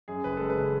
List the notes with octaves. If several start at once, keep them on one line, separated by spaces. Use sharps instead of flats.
F#2 G#4
F#1 B4
G#3 A4
B4
C#3